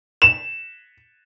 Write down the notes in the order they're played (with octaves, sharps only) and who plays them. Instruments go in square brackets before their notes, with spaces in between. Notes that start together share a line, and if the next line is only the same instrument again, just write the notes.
[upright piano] E7